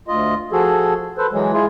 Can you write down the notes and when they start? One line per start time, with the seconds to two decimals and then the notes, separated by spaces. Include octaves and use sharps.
0.08 D2 F4 D#5
0.52 F3 F#4 G#4 A4
1.18 A4 B4 C5
1.32 E3 F#3 G#3
1.53 G#3 E4 F4 G#4